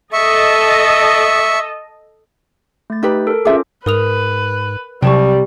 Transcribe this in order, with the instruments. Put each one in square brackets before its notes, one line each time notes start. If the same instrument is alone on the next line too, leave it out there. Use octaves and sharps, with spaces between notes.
[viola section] A4 D#5 [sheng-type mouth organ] E5 C#6
[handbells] A3 A6
[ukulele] D#4 G4 B4
[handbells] A4 A#4
[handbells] C#4 F4 D6 [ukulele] G#4 E5
[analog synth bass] G#2 [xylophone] A#4 D#6 F7 [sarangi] B4
[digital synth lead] C3 [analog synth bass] F#3 [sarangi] G3 [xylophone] G5 A5 C#6